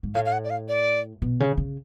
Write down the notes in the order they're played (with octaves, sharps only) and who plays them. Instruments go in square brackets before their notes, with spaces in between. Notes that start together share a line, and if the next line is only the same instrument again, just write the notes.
[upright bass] G#2
[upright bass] A2 [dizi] F5
[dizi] F5
F#5
D5
F5
D5
[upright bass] B2
C#3
C#3